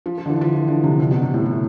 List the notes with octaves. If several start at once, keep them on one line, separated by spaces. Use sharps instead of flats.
F3
F3
D3
E3
F3
E3
D3
C3
C3
B2
C3
A2
A2